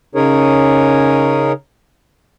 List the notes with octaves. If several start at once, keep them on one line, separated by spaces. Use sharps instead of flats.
C#3 C#4 D#4 G#4 A#4 C#5